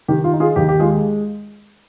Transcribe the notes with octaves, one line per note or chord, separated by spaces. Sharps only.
D#3 G4
F4
D#4
F4 G#4
D#2 G4
G4
G#3 F4 G#4